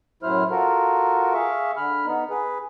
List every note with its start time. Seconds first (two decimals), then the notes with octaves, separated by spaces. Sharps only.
0.23 F#2 A2 F#3 E4 C5 F6
0.51 F4 F#4 A4 A#4
1.34 G#4 E5 F5 C#6
1.77 D3 B5 F6
2.06 B3 D#4
2.30 G#4 B4